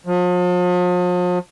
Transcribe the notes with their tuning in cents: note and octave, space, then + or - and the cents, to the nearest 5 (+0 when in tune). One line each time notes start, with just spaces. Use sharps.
F3 +40